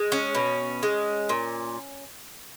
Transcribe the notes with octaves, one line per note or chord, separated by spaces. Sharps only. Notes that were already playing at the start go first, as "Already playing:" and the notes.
Already playing: G#3
C#4
B2
G#3
A#2